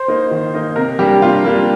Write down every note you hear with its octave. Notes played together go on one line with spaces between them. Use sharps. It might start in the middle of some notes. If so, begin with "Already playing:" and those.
Already playing: C5
A#3 D#4
D#3
A#3 D#4
C3 A#4
G3 A#3 D4 G4
C3 F4
G3 A#3 D4